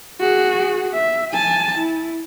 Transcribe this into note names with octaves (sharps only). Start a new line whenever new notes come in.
F#4 G#4
E5
G#5 A5
E4